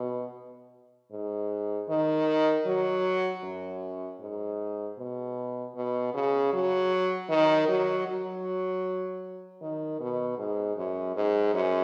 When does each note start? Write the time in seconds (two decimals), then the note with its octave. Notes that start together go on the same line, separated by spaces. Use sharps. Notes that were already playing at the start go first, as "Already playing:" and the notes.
Already playing: B2
1.12 G#2
1.89 D#3
2.66 F#3
3.43 F#2
4.20 G#2
4.98 B2
5.75 B2
6.14 C#3
6.53 F#3
7.29 D#3
7.68 F#3
8.07 F#3
9.61 D#3
10.00 B2
10.38 G#2
10.77 F#2
11.16 G#2
11.54 F#2